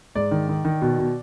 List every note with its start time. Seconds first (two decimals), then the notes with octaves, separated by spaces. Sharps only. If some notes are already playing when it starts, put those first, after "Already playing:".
0.15 G#2 D5
0.31 D#3
0.49 D#3
0.65 D#3
0.82 B2
0.98 B2